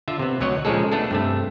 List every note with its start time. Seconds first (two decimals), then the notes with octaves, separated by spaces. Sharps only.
0.08 D3 F4 E5
0.19 C3 B3
0.41 D2 F#3 C#5 D#5 F#5
0.65 A#2 C#3 F3 G#3 G#4 A4
0.92 A3 B3 D4 G#4 A4
1.11 G2 C3 A3